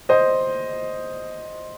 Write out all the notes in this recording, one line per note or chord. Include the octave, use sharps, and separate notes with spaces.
C5 D#5